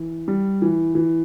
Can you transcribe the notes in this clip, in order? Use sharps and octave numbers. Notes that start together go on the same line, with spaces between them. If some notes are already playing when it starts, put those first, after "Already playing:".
Already playing: E3
G3
E3
E3